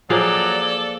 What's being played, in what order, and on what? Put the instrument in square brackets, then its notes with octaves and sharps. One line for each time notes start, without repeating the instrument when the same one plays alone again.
[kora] F3 A#3 G#4 [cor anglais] F#3 [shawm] A4 [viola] D5